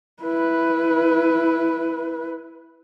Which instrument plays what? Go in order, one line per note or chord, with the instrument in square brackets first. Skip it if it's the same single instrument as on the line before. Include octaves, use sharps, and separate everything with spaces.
[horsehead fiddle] E4 B4